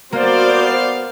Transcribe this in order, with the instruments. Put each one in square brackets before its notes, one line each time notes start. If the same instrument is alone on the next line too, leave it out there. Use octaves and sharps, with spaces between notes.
[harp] A#3 [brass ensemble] B3 F5 [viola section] F#4 C5 D5